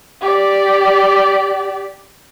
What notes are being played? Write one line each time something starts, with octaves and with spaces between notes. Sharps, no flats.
G4 D5